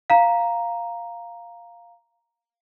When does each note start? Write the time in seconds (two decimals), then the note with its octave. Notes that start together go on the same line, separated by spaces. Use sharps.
0.10 F5 A#5